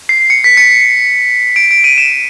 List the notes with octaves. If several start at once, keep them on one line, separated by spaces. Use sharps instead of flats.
C7
C#7
B6
C#7
D7
D7
D#7
E7